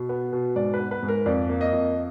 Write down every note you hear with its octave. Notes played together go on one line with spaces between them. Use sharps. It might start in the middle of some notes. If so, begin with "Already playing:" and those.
Already playing: B2
B3
B2
G#2 D5
B4
B3
B4
G#2
A#4
F2 D5
A#3
D#5
F2